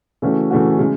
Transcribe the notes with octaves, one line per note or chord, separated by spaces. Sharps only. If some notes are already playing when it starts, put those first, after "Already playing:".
C#3 E3 A3 C#4 F#4
C#3 E3 A3 C#4 F#4
C#3 G#3